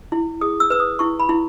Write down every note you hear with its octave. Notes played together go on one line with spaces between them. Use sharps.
E4
G#4 D#6
E6
B4 E6
D#6
E4 C#6
B5
E4